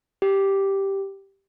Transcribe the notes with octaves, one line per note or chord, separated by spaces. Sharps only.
G4